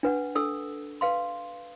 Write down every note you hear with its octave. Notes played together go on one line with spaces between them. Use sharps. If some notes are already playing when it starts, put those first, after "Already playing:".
D4 B4 F#5
D4 A4 E6
B4 F5 C6